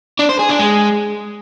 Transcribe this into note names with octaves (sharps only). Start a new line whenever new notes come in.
D4
C5
G#4
D4
G#3